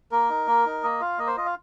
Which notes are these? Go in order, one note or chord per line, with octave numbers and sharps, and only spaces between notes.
A#3 A#4
D#4
A#3
D#4
A#3 D#5
F4 F5
A#3 D#5
C5
F4 D#5
F5